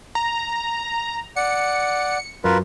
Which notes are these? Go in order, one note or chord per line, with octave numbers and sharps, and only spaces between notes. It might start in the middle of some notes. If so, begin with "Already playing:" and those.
A#5
D5 F#5 C#7
F#2 F4 A#4 B4